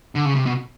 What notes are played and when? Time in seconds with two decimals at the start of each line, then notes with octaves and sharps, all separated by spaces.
0.15 D3
0.25 C#3
0.35 C3
0.46 B2